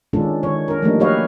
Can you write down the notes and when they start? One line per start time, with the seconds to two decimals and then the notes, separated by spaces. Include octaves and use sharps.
0.13 D#3 G#3 C#4 D4 F4 A4
0.43 D#3 C#5
0.68 D4 A#4
0.82 F3 G3 A3 A#3 D4 D#4
1.00 F#3 G4 B4 C#5 D#5 F5